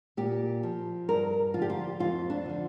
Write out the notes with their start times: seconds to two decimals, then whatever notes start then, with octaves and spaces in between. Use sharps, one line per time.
0.17 A#2 G4
0.63 F3
1.09 G2 A#4
1.54 D3 F3 F4
1.62 G4
1.70 F4
2.00 F2 F4
2.30 D4
2.46 D3 F3